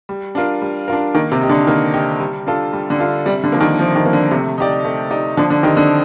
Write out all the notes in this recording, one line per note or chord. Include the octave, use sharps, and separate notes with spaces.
G3
D4 F4 A#4
G3
D4 F4 A#4
D#3 A#3
C3
D#4 G4
D3
D#3 A#3
D#4 G4
G3
D4 F4 A4
G3
D3
D4 F4 A4
C3 G3
D3
F3 A#3
D#3
C3 F3
D#3
F3 A#3
D3
C3 A3
D#4 G4 D5
A3
D#4 G4 D5
D3 F3
D3
D#3 C4 D#4 G4
D3